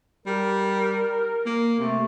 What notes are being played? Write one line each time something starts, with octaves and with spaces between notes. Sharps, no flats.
G3 A#4
A#3
C3 A3